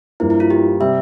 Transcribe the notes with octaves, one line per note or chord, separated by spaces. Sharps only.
G2 F3 A#3 E4
E4
F4
G4
C3 G3 E5